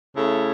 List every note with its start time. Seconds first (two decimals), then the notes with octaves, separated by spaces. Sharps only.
0.16 C#3 A3 E4 A4